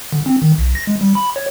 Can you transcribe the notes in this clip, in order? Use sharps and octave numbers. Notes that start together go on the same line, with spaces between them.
D3
C4
D#3
B1
A#6
G#3
G3
B5
C#5